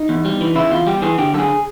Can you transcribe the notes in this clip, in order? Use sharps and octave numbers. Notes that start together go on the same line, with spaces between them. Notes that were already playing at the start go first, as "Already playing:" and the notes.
Already playing: D#4
E2
G3
E3
C#3 E4
E2 F4
G3 G4
E3 G#4
D3 G4
F#2 G#4 A4